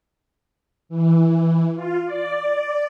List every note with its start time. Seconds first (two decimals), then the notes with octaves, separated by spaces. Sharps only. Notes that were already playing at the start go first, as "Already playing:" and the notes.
0.89 E3
1.75 F4
2.06 D5